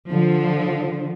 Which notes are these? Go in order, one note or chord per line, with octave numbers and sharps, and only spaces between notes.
D3 F3